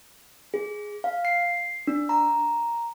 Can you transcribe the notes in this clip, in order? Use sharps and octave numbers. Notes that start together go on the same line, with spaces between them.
G#4
F5
C7
D4
A#5